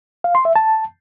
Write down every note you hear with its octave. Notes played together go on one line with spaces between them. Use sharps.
F5
C6
E5
A5